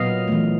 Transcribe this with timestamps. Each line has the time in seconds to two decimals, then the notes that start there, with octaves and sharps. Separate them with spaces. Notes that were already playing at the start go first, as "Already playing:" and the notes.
Already playing: A#2 F#3 B3 D#5 F5
0.28 E3 A3